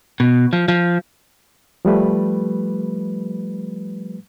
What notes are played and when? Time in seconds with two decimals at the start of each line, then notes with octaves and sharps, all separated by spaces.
0.20 B2
0.53 F3
0.68 F3
1.85 F3 G3 A3 B4